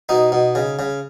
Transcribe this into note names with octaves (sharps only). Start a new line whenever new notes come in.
B2 D#4
B2
C#3
C#3